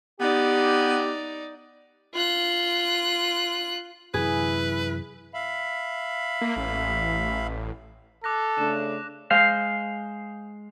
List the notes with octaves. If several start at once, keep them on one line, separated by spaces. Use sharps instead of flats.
B3 D#4 G4 D5
F4 F#6
F#2 C3 E3 E4 G#4 B4
E5 F5 B5
A#3
A1
A4 D6 F#6 A#6
C#3 A3 D4 E7
G#3 C5 F5